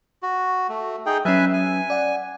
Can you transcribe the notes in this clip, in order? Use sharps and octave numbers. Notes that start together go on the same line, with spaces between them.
F#4
A3
D#4 G#4 G5
F#3 C#4 B4 E5 G#5
G#5
D5 F#5